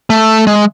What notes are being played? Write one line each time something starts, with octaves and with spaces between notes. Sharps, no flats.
A3
G#3